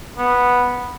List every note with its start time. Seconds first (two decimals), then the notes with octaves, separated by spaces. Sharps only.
0.18 B3